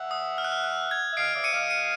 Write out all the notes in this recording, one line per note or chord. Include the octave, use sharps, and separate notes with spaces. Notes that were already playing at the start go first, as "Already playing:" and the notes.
Already playing: E5 F#5
D#6
F6
F#6
F6
F#6
G#6
E5
D#5 F5 C7 D7
D5 E5
C#7 D#7
D#5 F5
C#7 D#7